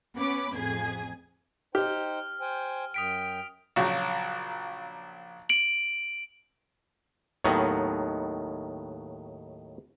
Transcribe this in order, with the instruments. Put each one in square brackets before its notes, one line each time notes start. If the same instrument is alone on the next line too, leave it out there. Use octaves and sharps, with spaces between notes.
[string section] B3 C#4 B5 D6
A1 F2 G#4 G#6
[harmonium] D#4 C5 G5 [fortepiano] G4 [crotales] F6
[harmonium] C5 G5 G#5
[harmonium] F#2 G5 [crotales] D#6 B6 D7
[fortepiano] A#1 C#3 F#3
[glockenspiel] D7 F#7
[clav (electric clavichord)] D#2 A2 D#3 F#3 B3